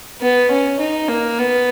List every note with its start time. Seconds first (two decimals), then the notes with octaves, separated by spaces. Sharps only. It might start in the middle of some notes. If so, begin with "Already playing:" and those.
0.21 B3
0.51 C#4
0.80 D#4
1.09 A#3
1.39 B3